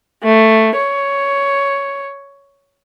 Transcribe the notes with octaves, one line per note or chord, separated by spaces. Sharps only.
A3
C#5